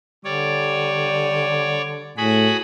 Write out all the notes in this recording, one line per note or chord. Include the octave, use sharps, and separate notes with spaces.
D3 G3 C#5 D5
A2 F#4 G#4 B5